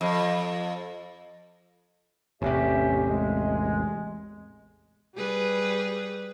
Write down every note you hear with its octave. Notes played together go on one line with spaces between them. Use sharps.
F2
A1 E2 C3 C#4 G4 E5
G#3
G3 G#4 B4